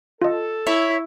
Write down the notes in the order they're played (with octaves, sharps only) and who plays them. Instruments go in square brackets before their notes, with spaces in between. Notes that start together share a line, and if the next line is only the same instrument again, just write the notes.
[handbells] F4 D#5 [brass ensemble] A4
[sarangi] E4 [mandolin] C#5 E5